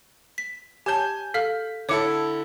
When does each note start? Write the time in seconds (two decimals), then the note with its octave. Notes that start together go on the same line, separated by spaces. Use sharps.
0.38 B6
0.86 G4 C#5 G#5 A5 G6
1.34 A4 F5 F6 B6
1.89 D3 E4 A4 C#5 D6 C#7